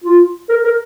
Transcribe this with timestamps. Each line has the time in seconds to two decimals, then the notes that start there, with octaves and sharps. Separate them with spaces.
0.04 F4
0.49 A#4
0.64 A#4